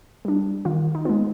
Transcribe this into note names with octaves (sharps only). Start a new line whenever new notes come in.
G3 D4
D#3 F4
D#4
G#3 B3 F4